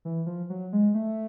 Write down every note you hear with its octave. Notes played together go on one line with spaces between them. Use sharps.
E3
F3
F#3
G#3
A3